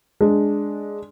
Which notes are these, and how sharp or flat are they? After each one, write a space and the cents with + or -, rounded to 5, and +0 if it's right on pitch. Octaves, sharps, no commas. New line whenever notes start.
G#3 +0 D4 +0